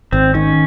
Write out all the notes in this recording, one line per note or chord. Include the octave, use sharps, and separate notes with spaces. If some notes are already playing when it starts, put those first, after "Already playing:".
G#1 C4
D#3 C#4